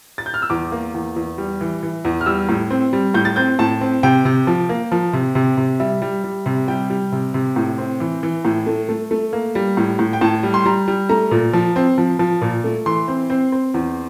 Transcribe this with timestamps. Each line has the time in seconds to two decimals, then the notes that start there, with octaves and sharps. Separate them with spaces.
0.18 A6
0.26 G6
0.34 F6
0.42 E6
0.50 E2 D6
0.72 A#3
0.94 E2
1.16 E2
1.38 G3
1.61 E3
1.83 E3
2.05 E2
2.21 F6
2.26 G3 E6
2.49 A2
2.71 C4
2.93 G3
3.14 A2 G6
3.25 A6
3.36 C4 G6
3.59 A2 A5
3.81 C4
4.03 C3 G5
4.25 C3
4.47 F3
4.69 A#3
4.92 F3
5.13 C3
5.35 C3
5.57 C3
5.80 G3 E5
6.02 G3
6.24 G3
6.46 C3
6.68 G3 G5
6.90 G3
7.12 C3
7.34 C3
7.56 A2
7.78 C4
8.00 E3
8.23 E3
8.45 A2
8.67 A3
8.89 A3
9.11 A3
9.33 A#3
9.55 G3
9.77 A2
9.99 A2
10.13 G5
10.21 A2 A5
10.43 G3
10.54 C6
10.65 G3 A#5
10.88 G3
11.09 A3 A#5
11.31 A#2
11.53 F3
11.76 C4
11.98 F3
12.19 F3
12.42 A#2
12.64 A3
12.86 E3 C6
13.08 C4
13.30 C4
13.52 C4
13.74 E2